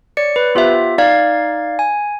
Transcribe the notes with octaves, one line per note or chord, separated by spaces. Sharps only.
C#5 D5 C#7
B4
B3 F4 G4 C5 E5
D#4 D5 F5 G#6
G#5